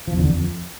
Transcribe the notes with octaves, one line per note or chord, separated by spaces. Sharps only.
F3
E2
D3
E2
F2